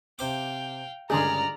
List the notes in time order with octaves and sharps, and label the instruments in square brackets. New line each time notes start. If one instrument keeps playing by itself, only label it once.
[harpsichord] C3 C5 D6 [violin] F5 G5
[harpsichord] C#2 G2 G#3 [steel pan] D3 G#4 [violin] D5 F6 [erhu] A#5